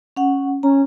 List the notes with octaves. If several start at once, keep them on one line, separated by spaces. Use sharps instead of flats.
C#4 F#5
C#4 A#5